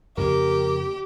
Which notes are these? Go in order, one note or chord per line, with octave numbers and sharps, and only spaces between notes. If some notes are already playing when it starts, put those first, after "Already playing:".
F2 C#3 A#3 G4 A#4